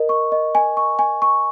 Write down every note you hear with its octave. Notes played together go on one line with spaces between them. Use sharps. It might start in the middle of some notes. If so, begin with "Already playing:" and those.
Already playing: A#4 D#5
C#6
D#5
G#5
C#6
G#5
C#6